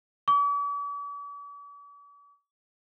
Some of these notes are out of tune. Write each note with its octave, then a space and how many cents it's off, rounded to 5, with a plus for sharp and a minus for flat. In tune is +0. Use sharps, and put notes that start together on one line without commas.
D6 -45